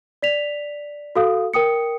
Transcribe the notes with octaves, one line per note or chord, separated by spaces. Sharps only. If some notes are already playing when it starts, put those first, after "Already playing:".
D5 B6 F7
F#4 A4 F5 D#6
A#4 G5 D#6 C#7